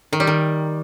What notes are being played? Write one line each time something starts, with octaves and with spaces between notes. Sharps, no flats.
D#3
G3
D#3